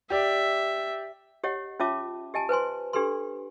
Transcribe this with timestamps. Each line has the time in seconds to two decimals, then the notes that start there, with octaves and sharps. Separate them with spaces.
0.10 G4 D5 E5
1.44 G4 C#5 D#5 F#5
1.80 C#4 F4 C#5 E5 A5 D6
2.34 G4 D#5 G#5 A5
2.49 B4 C5 G#5 C6
2.93 D4 G4 A4 B4 C6